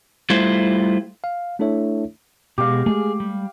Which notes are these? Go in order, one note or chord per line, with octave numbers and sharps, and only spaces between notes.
G3 A3 E4 F4 C5
F5
A3 D4 E4 A4 C#5 E5
B2 G#3 G4 F5
G#3 A3 G#4
G3